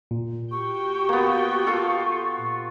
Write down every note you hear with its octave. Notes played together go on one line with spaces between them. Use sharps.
A#2
F#4 G4 G5 C#6
A#3 B3
F4 A4